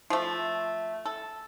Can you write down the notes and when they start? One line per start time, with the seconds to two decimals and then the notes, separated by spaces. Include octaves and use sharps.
0.10 F3 A3
1.06 A4